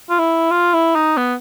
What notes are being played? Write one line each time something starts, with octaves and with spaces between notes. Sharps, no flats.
F4
E4
F4
E4
D#4
B3